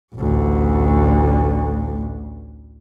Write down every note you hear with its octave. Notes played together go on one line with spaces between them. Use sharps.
A1 D2